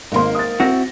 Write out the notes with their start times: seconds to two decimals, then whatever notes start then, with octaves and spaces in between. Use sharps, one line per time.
0.12 G#1 G#2 A#3 D#4 C6
0.35 D#6 A6
0.60 C4 E4 F#4 A#6